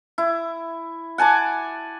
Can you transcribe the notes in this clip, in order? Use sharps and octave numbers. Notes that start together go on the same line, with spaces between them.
E4
F#5 G#5 A5 D6